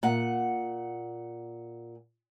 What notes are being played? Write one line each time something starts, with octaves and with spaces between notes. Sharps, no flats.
A#2 F#5